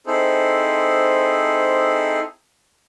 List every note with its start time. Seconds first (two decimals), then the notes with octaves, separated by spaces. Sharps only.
0.07 C4 D#4 E4 G#4 A4 C5